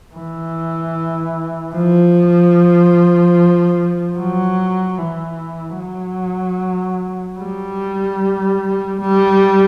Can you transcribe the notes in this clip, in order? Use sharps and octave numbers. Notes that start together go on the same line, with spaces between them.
E3
F3
F#3
E3
F#3
G3
G3